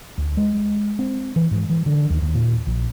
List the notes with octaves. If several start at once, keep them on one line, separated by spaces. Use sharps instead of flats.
D2
G#3
C4
E3
G#2
E3
D3
D#2
D#2
A#2
A#1